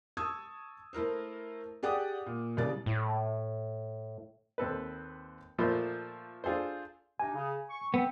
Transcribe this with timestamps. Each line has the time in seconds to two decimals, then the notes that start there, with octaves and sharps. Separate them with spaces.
0.17 A5 C#6 D#6 E6 G#6
0.93 A3 E4 A#4 C5
1.83 G4 G#4 D5 F#5 G5 D#6
2.26 A#2
2.57 C2 C#3 D5 A6
2.86 A2
4.58 D#2 C4 A4 B4
5.58 A#2 F3 A3 C5 B5
6.44 D4 F4 G#4 A4 C5
7.20 C3 D4 D#4 G#5
7.34 C#3
7.70 C#6
7.94 B3 C4